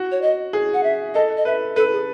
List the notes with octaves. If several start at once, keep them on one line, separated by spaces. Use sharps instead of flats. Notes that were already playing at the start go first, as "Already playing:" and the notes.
Already playing: F#4
C#5
D#5
G#4
F#5
E5
A4 D#5
D#5
B4 E5
A4 B4
G#4